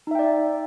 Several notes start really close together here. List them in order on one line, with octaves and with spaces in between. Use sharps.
D#4 E5 G5 D5